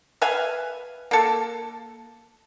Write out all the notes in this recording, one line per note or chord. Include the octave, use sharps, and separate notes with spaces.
B4 E5 F5 G#5
A#3 A4